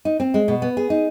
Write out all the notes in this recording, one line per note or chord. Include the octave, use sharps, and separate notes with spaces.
D#4
C4
G#3
B2
B3
G#4
D#4